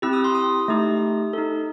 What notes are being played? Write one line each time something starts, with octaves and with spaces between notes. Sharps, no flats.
C4 E4 G4 E6
D#6
C6
D#6
A3 D#4 G4
D#4 A4